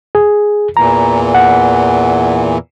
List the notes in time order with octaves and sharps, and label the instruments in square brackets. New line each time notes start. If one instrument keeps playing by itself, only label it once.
[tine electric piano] G#4
[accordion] E2 A#2 E3 [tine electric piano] A#5
[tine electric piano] F#5